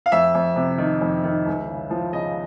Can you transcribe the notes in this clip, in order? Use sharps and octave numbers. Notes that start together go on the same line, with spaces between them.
F5
F2 E5
F2
C3
D#3
F2
D#3
C#2
C#3
F3
C#3 D#5